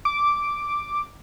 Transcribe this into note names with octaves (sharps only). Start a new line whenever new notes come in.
D6